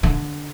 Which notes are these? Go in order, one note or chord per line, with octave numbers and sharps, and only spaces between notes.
D3